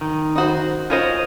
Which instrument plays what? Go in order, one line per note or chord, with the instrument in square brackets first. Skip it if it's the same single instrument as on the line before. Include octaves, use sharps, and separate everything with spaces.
[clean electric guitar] D#3
[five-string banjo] D#4 F#4 C5
[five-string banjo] C#4 A#4 C5 [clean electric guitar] F4 C#5 D#5